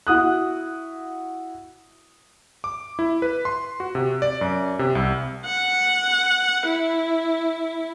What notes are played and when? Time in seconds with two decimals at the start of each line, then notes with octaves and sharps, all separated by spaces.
0.07 E4 F#4 D#6 F#6
2.64 D6
2.99 E4
3.22 B4
3.45 C6
3.80 F#4
3.95 C3
4.22 D5
4.41 F#2
4.79 C3
4.95 C2
5.45 F#5
6.66 E4